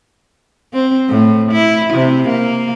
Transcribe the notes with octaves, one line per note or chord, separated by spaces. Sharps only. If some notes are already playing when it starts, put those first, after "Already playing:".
C4
A2
E4
C3
A#3